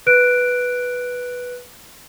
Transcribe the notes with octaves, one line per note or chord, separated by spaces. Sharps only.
B4 F#6 D7